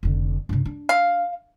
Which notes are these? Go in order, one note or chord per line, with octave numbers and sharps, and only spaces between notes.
F1 D3
G2 C3
D4
F5